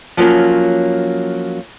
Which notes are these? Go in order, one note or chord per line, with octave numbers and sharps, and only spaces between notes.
F3 F#3 A#3 C#4